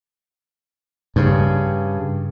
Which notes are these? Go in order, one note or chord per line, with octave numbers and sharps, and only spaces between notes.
G2 C#3